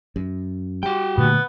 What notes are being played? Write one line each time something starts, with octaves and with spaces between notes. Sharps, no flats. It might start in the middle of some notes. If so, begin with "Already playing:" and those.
F#2
G3 F#4 G5
A#2 D3 A3 B3